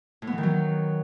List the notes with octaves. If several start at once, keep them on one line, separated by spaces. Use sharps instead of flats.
A2
B3
E3
D#3
F#3